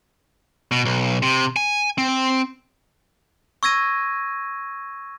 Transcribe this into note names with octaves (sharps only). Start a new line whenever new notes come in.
B2
B1
C3
G#5
C4
C#6 E6 G#6 A#6 D#7